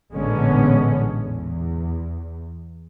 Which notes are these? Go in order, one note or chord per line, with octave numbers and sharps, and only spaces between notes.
A1 A#2 D3 G#3 B3 C#4
E2